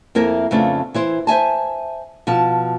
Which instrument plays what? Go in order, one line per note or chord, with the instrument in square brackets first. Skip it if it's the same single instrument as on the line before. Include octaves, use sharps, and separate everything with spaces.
[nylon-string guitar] F2 A#3 E4 A#4 E5
F2 C#3 A3 B3 D4
E3 E4 C5
C5 E5 G#5 A5
B2 F3 E4 A5